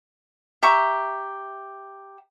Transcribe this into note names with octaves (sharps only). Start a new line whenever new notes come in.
G4 E5 A#5 C#6